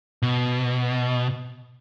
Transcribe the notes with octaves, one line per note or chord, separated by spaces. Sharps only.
B2